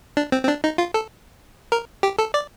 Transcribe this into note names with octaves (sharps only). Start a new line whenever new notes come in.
D4
C4
C4
D4
D#4
F4
A4
A#4
G4
A4
D5